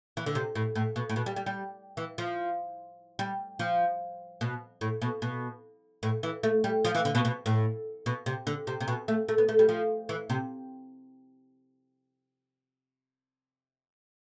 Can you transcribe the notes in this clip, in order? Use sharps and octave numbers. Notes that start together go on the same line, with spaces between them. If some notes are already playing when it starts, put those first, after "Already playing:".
E3
D3
C3
A2
A2
B2
A2
B2
G3
G3
G3
E3
F3
G3
F3
B2
A2
B2
B2
A2
E3
A3
G3
F3
E3
D3
B2
B2
A2
B2
C3
D3
C3
C3
B2
A3
A3
B3
A3
G3
F3
E3
C3